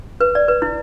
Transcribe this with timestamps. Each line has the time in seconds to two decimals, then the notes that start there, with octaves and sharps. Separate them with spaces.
0.21 B4
0.35 D5
0.48 B4
0.62 E4